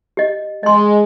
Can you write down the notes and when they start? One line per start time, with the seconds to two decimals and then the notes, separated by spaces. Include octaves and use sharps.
0.17 G4 D#5
0.63 G#3 D#5 C6